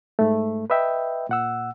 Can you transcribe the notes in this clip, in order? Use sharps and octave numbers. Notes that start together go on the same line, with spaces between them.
G#2 A3
B4 D#5 E5 G5
A#2 F#5 E6